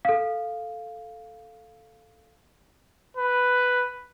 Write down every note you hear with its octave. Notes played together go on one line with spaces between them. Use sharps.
A4 F5
B4